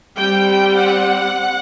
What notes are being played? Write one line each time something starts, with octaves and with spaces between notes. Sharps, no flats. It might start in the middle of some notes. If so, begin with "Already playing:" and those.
G3 C4 G5
G5
F#5